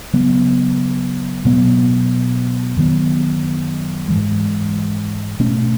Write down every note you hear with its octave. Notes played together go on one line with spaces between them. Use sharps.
C#3 F#3 B3
B2 F#3 B3
F#2 D#3 F#3 B3
G#2 E3 G#3
B2 A3 C#4